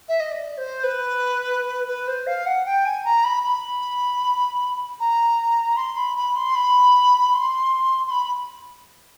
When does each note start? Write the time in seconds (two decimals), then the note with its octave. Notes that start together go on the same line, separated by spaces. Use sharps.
0.09 E5
0.20 D#5
0.31 D5
0.58 C5
0.83 B4
1.88 B4
2.08 C5
2.27 F5
2.46 F#5
2.66 G5
2.85 G#5
3.05 A#5
3.24 B5
3.43 B5
5.00 A#5
5.77 C6
5.97 B5
6.17 B5
6.36 C6
6.55 B5
7.34 C6
8.07 C6
8.11 B5